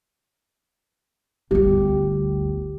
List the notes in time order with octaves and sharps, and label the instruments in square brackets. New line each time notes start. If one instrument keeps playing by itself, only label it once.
[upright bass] G1 D2 [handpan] G4